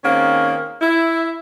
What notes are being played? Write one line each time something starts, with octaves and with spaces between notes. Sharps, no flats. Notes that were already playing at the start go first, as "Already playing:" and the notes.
D#3 A#3 C4 C#4 G#4
E4